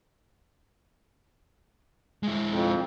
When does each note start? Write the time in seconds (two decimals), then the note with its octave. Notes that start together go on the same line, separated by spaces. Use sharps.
2.23 G#3 E4
2.49 F2